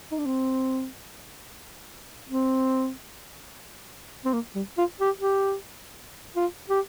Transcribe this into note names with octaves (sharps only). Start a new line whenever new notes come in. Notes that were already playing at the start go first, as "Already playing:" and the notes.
D#4
D4
C4
C4
C4
A#3
G3
F4
G4
G4
F4
G4